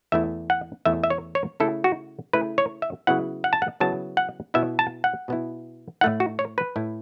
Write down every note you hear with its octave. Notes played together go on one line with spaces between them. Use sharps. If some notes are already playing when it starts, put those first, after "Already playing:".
E2 E3 A3 E4 E5
F#5
E2 E3 A3 E4 E5
E5
C#5
C#5
C#3 A3 E4 A4
F#4
C#3 A3 E4 B4
C#5
E5
C#3 F#3 B3 E4 F#5
F#5
A5
F#5
C#3 F#3 B3 E4 A5
F#5
B2 B3 E4 E5
A5
F#5
B2 B3 E4
A2 A3 E4 F#5
F#4
C#5
B4
A2 A3 E4